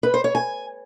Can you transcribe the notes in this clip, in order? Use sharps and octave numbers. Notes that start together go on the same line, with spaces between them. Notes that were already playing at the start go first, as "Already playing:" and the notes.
B4
C5
C#5
G#5